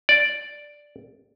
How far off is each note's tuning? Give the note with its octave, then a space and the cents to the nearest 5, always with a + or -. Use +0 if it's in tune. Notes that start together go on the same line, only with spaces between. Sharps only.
D5 +0